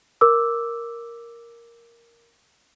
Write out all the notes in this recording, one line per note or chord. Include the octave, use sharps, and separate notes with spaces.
A#4 D6 E6